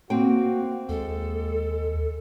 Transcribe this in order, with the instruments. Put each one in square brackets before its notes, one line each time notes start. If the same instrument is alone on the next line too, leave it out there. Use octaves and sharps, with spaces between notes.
[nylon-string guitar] A#3 C4 G5 [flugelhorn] F#4
[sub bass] D#2 [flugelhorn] G#3 [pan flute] A4